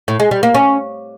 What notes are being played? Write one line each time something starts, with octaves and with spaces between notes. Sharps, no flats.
A2
G#3
G3
A#3
C#4